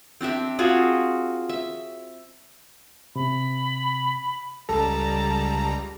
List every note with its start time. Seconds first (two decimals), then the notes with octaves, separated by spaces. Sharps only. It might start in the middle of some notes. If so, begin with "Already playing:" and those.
0.21 C4 D4 G4 E5
0.59 C4 F4 F#4 G#4
1.49 E5
3.16 C3 B5
4.69 C#2 G3 A4 A5 A#5